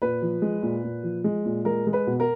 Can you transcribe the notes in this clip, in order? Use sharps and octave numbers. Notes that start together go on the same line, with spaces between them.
A#2 B4
F3
G#3
A#2
A#2
F3
G#3
A#2
G#3 A#4
G#3
B4
B2
A#4